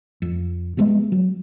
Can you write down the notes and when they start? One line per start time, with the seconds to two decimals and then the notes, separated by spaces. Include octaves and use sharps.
0.22 F2
0.77 F3 G3 G#3 B3
1.12 F#3